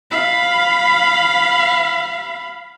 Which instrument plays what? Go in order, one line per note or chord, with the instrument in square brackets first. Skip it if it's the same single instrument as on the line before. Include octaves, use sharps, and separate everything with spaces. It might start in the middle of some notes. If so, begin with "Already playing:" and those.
[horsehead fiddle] F5 B5